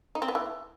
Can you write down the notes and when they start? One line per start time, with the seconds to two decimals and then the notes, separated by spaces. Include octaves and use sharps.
0.15 D#4
0.22 C4
0.28 B3
0.35 E3